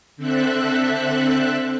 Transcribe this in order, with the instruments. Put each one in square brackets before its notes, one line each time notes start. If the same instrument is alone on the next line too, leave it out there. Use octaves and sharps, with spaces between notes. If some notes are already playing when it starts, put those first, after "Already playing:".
[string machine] D3 C4 A4 E5 F#6